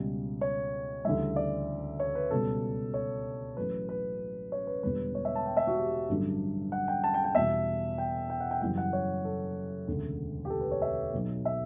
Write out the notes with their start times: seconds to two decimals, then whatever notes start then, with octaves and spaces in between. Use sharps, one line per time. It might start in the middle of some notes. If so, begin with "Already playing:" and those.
Already playing: C#2 B2 G3
0.41 C#5
1.05 D2 C#3 E3 G3 E5
1.36 D5
2.00 C#5
2.15 B4
2.31 C#2 B2 G3 A4
2.94 C#5
3.57 A1 A2 F#3 B4
3.89 B4
4.52 C#5
4.67 B4
4.83 E1 E2 D3 G3 B4
5.15 C#5
5.25 E5
5.35 A5
5.46 G5
5.57 E5
5.67 F#4
5.77 G4
6.09 A1 G2 D3 F#3
6.72 F#5
6.88 G5
7.04 A5
7.14 G5
7.24 G5
7.35 E2 B2 G3 E5
7.98 G5
8.30 G5
8.40 F#5
8.51 G5
8.61 F#1 F#2 E3 G3 G5
8.77 F#5
8.93 C#5
9.25 A4
9.87 E1 D2 C#3
10.45 G4
10.50 A4
10.61 B4
10.71 C#5
10.82 E5
11.13 B1 B2 F#3
11.45 E5